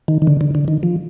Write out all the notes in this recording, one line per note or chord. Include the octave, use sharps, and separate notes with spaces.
D#3
D#3
D3
D3
D3
D#3
F3